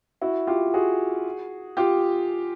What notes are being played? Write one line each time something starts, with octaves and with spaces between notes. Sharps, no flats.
E4 F#4
F4 G4
F#4 G#4
F4 G4